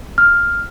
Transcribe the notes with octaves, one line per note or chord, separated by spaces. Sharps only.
F6